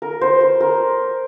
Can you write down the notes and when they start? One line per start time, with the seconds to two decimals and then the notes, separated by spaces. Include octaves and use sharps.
0.02 A#4
0.21 C5
0.41 C5
0.60 A#4